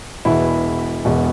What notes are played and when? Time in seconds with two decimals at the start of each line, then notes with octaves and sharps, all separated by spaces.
0.25 E1 E2 B2 E4
1.05 E1 E2 B2